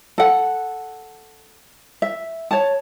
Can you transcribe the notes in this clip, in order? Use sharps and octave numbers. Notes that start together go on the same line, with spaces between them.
A4 F#5
E5
C#5 A5